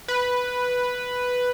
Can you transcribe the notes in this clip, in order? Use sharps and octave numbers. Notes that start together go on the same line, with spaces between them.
B4